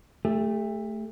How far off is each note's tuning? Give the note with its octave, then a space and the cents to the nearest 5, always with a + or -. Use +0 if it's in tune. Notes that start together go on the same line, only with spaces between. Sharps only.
A3 +0 G4 +40